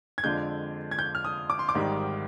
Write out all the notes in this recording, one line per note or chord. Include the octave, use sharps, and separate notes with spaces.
G#6
F2 D3 G#3 D4 F4 G6
G#6
G6
F6
D#6
D6
C6
D6
G#1 G#2 D#3 G3